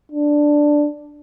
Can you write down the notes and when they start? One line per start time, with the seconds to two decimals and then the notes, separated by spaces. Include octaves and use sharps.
0.12 D4